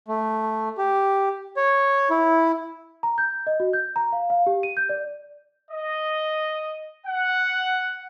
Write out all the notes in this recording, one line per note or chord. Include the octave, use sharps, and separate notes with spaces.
A3
G4
C#5
E4
A#5
G6
D#5
F#4
G6
A#5
F5
F5
G4
D#7
G6
D5
D#5
F#5